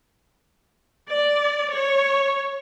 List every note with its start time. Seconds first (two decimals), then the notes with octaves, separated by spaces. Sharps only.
1.09 D5
1.74 C#5